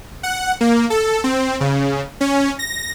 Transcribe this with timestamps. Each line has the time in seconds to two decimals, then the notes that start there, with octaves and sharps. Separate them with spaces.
0.23 F#5
0.61 A#3
0.90 A4
1.24 C4
1.60 C#3
2.21 C#4
2.59 A#6